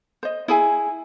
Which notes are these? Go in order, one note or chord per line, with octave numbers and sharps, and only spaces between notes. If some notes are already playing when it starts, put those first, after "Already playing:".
C5 D#5
E4 G#4 G#5